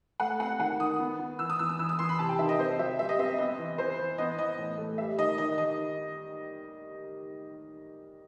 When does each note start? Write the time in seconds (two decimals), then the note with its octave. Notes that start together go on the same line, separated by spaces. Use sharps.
0.20 A3 F#5
0.39 C4 F#5
0.59 D#3 F#5
0.79 D#3 D#6
0.99 B3
1.19 B3
1.39 E3 E6
1.50 D#6
1.59 E3 E6
1.69 D#6
1.79 E3 E6
1.89 D#6
1.99 E3 C6
2.09 B5
2.19 C3 A5
2.29 G5
2.39 D#3 E5
2.49 D#5
2.59 C4 C5
2.79 F#3 E5
2.99 G3 E5
3.09 D#5
3.19 C4 E5
3.38 B3 D#5
3.58 E3
3.78 E3 C5
3.99 E3
4.18 B3 D#5
4.38 E3 D#5
4.58 A2
4.78 A3
4.98 G3 E5
5.18 D#3 D#5
5.38 D#3 D#5
5.58 D#3 D#5